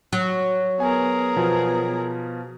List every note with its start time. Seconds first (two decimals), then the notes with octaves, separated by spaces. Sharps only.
0.13 F#3
0.80 B3 G#4 A#4 G#5
1.36 B2 F3